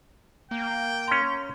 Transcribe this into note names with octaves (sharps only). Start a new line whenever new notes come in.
A#3 G5
C#4 A#5 C6